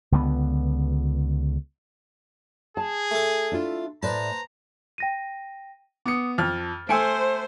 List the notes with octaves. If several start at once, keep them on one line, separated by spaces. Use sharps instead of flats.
C#2 D3 E3 B3
G#4 A5
A3 A4
D4 E4 F4
A2 B4 C5 D5 A5 A#5
G5 A#6 D#7
B3 D6 D#6 C#7
F2 F6 A6
A3 C5 G#5 E6 C#7 D7